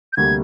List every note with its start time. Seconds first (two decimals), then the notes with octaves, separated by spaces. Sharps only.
0.13 G6
0.17 D2 C3 G3 A#3 G#6